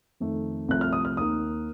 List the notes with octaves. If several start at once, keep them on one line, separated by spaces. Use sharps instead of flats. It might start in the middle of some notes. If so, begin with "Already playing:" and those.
F2 D#3 A3
C2 C3 F3 A3 F#6
F6
D#6
F6
D#2 D#3 A#3 D#6